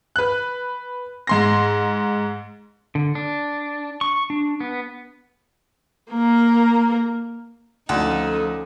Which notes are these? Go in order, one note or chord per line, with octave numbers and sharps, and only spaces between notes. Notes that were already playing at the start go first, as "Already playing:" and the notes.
B4 F#6
G#2 C6 A#6
D3
D4
C#6
D4
B3
A#3 A#4
D2 F3 C#4 D#4 A4